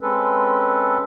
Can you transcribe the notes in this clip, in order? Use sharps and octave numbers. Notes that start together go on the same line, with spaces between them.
G#3 C4 C#4 A4 B4